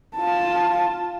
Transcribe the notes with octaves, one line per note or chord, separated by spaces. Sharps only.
F4 A5